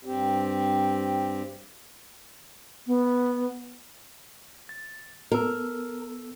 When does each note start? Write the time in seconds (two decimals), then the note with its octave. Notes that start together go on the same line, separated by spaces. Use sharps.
0.05 G2 C4 G4
2.87 B3
4.69 A6
5.32 B3 A4 A#4 E6